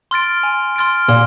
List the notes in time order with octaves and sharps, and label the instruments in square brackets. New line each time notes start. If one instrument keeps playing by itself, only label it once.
[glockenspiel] C6 F6 A6 D7
G#5
C6 F6 A6 D7
[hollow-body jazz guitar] A#2 [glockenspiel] C6